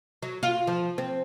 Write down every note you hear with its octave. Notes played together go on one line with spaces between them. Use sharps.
F#3
F4
F3
C4